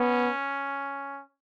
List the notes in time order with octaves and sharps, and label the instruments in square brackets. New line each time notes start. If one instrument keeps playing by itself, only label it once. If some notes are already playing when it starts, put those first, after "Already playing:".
Already playing: [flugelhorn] B3 [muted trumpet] C#4